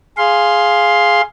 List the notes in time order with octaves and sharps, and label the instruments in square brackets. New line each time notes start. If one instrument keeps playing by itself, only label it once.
[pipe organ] G#4 F5 C6